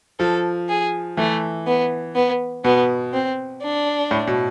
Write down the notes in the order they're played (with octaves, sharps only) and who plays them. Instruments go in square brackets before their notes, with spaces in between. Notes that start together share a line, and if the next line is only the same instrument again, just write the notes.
[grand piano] F3 [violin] A4
[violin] G#4
[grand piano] E3 [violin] A3
[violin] B3
B3
[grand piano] B2 [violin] B3
[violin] C4
D4
[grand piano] A2
B2